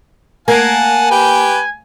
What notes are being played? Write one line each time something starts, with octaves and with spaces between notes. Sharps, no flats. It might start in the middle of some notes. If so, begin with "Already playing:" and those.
A#3 F#5 G#5 A5
G4 B4 G5